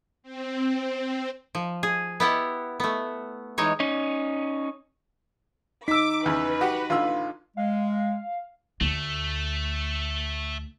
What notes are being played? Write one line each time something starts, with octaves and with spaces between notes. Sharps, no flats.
C4
F3
G#4
B3 E4 G4 F#5
A3 B3
E3 G#3 D#4 C#5
C#4 D#4
D#4 D6 E6 B6
E2 C#3 B4
F#4 G4 F#5
A1 D3 F4 E6
G#3 F5
D2 A3